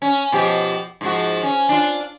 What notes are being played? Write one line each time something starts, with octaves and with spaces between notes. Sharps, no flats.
C#4
B2 F3 G4
G#2 F3 F#4
C#4
D4 F4